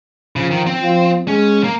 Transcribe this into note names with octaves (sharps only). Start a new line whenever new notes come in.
C#3 F3
D#3
C4
F3
G#3 C#4
A#3